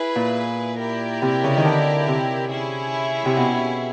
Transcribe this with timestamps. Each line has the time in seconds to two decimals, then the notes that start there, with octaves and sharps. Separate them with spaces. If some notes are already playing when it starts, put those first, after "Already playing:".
Already playing: E4 G#4 B4
0.16 A#2
0.79 E4 G4 A#4 D5
1.22 C3
1.44 C#3
1.57 D#3
1.65 D3
2.07 C3
2.50 C#4 E4 G#4
3.25 C3
3.37 B2